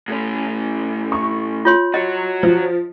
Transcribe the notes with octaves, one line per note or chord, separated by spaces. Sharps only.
A2 C#4
C#6
F4 C#5 C6
F#4 C#5 D#5
F3